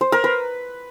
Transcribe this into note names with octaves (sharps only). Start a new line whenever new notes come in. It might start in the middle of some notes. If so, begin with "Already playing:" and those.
C5
A#4
B4